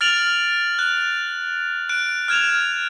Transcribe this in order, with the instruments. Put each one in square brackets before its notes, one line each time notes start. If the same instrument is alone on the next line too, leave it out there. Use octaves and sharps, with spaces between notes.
[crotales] F6 A6 D7 F7 F#7
F#6
F#6 D7
F6 G#6 E7 F7